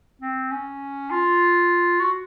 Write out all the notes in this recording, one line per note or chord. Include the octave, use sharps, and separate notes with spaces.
C4
C#4
F4
F#4